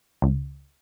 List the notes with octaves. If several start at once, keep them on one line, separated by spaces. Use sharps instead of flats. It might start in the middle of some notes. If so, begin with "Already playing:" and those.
C#2